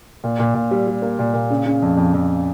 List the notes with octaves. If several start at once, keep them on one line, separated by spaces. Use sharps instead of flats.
A#2
A#2
A#2
G3
G3
A#3
A#2
A#2
C#3
C#3
F2
F2
F2